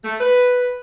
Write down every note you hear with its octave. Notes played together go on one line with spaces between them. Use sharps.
A3
B4